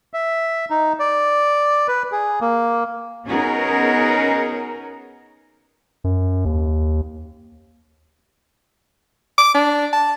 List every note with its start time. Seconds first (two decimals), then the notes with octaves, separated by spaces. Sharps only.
0.14 E5
0.70 D#4
1.00 D5
1.88 B4
2.12 G#4
2.41 A#3
3.27 B3 C#4 D#4 F#4 G#4 A#4
6.04 F#2
6.45 D#2
9.38 D6
9.55 D4
9.93 A5